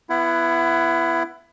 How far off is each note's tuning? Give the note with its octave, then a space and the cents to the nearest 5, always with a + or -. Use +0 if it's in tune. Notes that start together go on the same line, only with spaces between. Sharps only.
B3 +0 E4 +20 F#5 +0